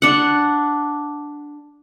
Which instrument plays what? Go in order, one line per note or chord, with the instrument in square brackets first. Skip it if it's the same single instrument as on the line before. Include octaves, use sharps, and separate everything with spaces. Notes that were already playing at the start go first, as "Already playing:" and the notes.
[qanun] D4 F#5